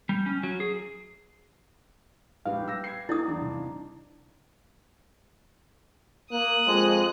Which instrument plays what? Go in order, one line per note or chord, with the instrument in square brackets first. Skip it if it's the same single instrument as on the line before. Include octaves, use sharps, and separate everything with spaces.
[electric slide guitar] G3
C#4
F#3
G#4
[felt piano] A#1 G#2 [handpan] G4 B4 [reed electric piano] F5
[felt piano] G3 E6 A#6
G#6 C7
[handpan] D#4 D5 [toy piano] E4 D#6
[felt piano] E2 G2 [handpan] D4
[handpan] C3
[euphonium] A#3 [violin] D#6 F#6
[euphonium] F2 [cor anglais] G#3